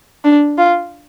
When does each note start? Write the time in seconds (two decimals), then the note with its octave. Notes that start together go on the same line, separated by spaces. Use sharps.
0.24 D4
0.58 F4